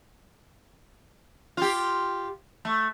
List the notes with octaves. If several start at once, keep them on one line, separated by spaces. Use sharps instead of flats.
F4 G4
A3